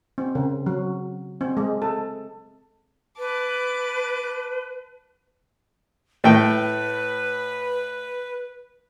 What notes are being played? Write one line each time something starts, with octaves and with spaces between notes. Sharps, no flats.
C4
C#3
F#3
C4
G#3
A4
B4 A5 D6
A2 B4 G5